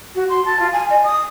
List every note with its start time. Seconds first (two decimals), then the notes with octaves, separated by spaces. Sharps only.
0.15 F#4
0.29 C6
0.45 A5
0.59 F4
0.72 G#5
0.90 D#5
1.04 D#6